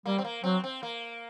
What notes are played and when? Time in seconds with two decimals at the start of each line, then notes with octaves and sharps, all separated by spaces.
0.06 G3 A#3
0.18 C4
0.24 A#3
0.44 F#3 C4
0.64 C4
0.83 A#3